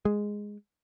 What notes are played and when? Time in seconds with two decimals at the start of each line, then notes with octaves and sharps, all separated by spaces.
0.05 G#3